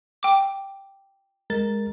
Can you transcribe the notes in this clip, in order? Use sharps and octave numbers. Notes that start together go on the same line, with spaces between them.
G5 D6
G#3 A#4 A6